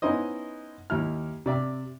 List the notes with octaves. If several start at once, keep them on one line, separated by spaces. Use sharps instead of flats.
B3 C#4 D#4 E4 C5 D#5
D#2 E4 F6
C3 D5 E5